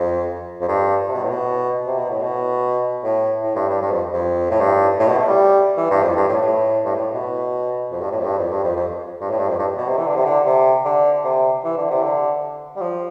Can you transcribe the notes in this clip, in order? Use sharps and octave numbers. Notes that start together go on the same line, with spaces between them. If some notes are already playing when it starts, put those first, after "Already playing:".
Already playing: F2
F2
G2
C3
B2
A2
B2
C3
B2
A2
B2
A2
A2
G2
G2
G2
F2
F2
A2
G2
A2
B2
A3
G3
E3
G2
F2
G2
A2
A2
G2
A2
B2
F2
G2
A2
F2
G2
F2
G2
F2
F2
G2
A2
G2
F2
G2
B2
C3
E3
D3
C3
D3
C3
D3
C3
E3
D3
C3
D3
G3
F3